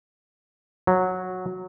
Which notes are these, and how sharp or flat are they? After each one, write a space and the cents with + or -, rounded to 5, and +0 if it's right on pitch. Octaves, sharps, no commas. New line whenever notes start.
F#3 -10